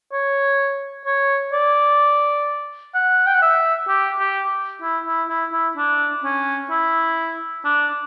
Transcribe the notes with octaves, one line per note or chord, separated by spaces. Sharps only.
C#5
C#5
D5
F#5
G5
F#5
E5
G4
G4
E4
E4
E4
E4
D4
C#4
E4
D4